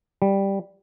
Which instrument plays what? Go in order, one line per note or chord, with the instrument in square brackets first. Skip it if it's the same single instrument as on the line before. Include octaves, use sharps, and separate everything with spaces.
[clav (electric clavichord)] G3